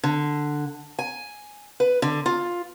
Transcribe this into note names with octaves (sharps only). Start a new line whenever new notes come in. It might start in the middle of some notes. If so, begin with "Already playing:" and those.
D3
G#5
B4
D3
F4